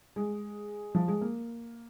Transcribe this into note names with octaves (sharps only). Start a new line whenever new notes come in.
G#3
F3
G#3
A#3